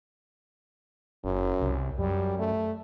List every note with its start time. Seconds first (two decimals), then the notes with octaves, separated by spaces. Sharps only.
1.24 F#1 F#2
1.60 C2
1.98 F#2 G3
2.39 A3